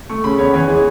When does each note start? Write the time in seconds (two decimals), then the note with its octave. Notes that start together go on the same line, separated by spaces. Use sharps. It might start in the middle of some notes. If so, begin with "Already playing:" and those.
0.10 A3 C#6
0.24 C#3 B5
0.39 E2 C#5
0.54 E3 C#5
0.68 G#3